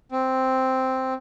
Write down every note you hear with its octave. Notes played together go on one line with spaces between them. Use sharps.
C4